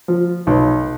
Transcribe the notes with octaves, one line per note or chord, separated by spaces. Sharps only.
F3
B1